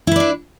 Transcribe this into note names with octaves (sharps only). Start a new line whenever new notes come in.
D4 E4 B4 D5